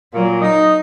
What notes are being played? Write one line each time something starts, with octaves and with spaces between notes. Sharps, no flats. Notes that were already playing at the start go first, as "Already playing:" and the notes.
A#2 F#3
D#4